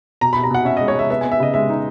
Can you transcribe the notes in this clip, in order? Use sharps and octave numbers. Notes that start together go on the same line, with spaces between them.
B2 A#5
B2 B5
A#5
B2 F#5
C#4 E5
D#5
G#3
C#5
G#3 E5
B3 E5
G#5
B3
E5
C#3 D#5
G#3 E5
D#4